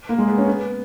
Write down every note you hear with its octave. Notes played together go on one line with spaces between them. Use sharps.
A#3
G#3
B3
C#4
B3